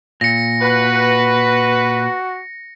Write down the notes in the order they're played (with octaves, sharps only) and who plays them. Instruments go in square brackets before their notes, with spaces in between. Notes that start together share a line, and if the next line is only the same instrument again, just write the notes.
[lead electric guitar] A#2 [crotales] A#6 C#7
[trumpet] F#4 [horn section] B4